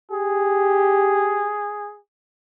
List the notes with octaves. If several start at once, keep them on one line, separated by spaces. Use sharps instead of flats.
G4 G#4